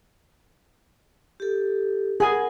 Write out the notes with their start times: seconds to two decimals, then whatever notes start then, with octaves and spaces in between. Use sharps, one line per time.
1.40 G4 A4
2.20 G#4 A#4 F#5 G#5 B5